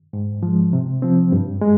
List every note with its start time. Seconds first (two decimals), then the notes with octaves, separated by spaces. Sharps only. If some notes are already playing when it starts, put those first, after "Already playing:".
0.13 G#2
0.43 F3 G#3
0.73 C3
1.02 F3 C4
1.32 G2
1.61 G#3